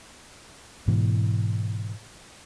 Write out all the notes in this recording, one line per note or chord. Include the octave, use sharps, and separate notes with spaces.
G#2 B2 E3